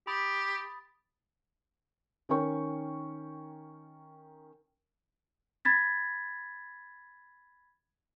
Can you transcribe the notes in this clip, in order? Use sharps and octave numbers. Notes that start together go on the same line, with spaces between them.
G4 B5 D#6 A6
D#3 C#4 A#4 G5 C#6
B5 G#6 A6 B6